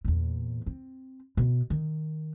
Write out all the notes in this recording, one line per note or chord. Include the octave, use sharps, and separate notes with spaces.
E2 A#2
C4
B2
D#3